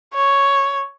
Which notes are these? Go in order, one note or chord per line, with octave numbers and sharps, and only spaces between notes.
C#5